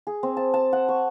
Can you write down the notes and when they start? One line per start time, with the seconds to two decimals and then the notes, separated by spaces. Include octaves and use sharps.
0.07 G#4
0.23 C4
0.37 A5
0.54 A5
0.73 F#5
0.89 C#6